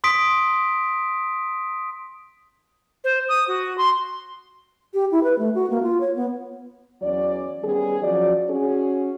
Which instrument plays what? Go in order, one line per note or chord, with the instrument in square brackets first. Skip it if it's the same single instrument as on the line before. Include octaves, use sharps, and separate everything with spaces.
[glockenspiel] C6 D#6 B6 D7
[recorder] C5
D#6
F#4
C6
[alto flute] G4
E4
B4
A3
F#4
A#3
F4
C#5
B3
[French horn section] E2 F#3 C#4 D5
D#3 G3 B3 C#4 G#4
F3 F#3 C#4 F#4 D5
C#4 F#4 G#4